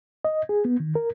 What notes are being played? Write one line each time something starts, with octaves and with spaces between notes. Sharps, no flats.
D#5
G#4
B3
D#3
A#4